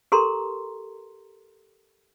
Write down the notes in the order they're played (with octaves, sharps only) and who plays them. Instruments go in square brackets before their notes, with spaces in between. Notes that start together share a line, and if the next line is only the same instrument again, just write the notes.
[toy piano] G4 A4 A#4 A#5 C6